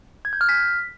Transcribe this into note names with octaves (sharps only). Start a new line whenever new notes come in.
G#6
G6
F6
B6